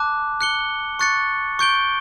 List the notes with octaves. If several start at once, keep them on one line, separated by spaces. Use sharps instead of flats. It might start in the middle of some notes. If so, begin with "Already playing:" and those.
Already playing: A5 D6 F#6
F#6 C#7 G7
C#6 F#6 A6 C#7
C#6 G6 D7 G7